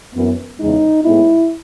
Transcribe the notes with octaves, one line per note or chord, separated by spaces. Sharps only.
F#2 E3 B3
E2 C#3 G#3 D#4
A2 G#3 B3 E4